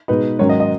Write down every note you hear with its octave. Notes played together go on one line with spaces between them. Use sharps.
B2 G#3 D#4 B4
G#2 D#3 F#3 C#4 C#5
D#5
D#5